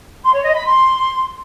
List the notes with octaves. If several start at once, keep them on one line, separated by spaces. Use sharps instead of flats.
C6
C#5
D#5
B5
C6